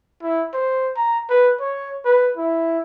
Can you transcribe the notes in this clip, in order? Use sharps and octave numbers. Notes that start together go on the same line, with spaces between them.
E4
C5
A#5
B4
C#5
B4
E4